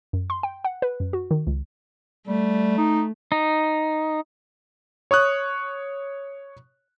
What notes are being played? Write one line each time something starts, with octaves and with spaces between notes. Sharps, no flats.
F#2
C6
G5
F#5
B4
F#2
F#4
D#3
C#2
G3 A3
D#4
D#4
C#5 C#6 D#6 F#6